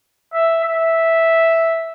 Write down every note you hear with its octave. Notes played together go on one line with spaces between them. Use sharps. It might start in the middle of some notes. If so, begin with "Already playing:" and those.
E5
E5